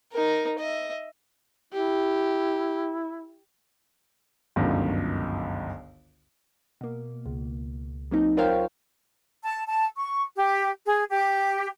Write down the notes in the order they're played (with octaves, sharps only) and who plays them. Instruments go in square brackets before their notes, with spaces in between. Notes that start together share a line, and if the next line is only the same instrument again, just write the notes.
[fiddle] D#4 A#4
D#5 E5
[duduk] E4 [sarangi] G4
[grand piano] G1 C#2 F#2 D3 D#3
[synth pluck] B2 A#3
C#2
F#3 A#3 C4 D#4
F4 A#4 C5 C#5 F5 G5
[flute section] A5
A5
C#6
G4
G#4
G4